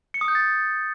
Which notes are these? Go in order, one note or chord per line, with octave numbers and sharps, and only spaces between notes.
C#7
D#6
G6
A6